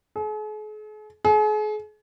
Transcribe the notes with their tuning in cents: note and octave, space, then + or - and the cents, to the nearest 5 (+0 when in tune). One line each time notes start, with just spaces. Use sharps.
G#4 +45
G#4 +40